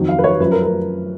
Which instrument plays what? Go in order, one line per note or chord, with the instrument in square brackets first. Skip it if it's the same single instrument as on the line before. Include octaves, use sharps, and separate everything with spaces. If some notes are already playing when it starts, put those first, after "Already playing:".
Already playing: [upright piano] F2 D#3 F#3
F5
B4
C#5
F#2 F3 B4
A#4
A#4